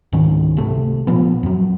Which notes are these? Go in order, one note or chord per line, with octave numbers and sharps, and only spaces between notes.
C#2 G#2 D#3 C#4
G#1 C3 A3
A#2 F3 B3
F2 F#3